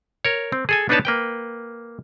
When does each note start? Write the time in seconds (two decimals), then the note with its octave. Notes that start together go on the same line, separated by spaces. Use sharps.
0.25 A#4 C#5
0.52 C4
0.69 G#4 A4 G#5
0.89 B3 D4 D#4 B4 C#5 A5
1.05 A#3 B4 G5